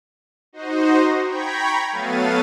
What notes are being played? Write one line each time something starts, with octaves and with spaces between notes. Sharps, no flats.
D#4 F#4 C5 D#5
G5 A#5 B5 C#6 G#6 B6
F#3 A3 B3 F5 A6 D#7